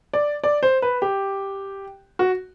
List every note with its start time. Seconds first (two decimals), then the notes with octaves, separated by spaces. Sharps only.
0.14 D5
0.44 D5
0.63 C5
0.82 B4
1.02 G4
2.19 F#4